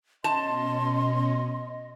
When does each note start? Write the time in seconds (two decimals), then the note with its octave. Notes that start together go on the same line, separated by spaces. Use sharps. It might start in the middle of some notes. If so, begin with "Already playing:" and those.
0.24 B2 C#4 D#5 A5 C6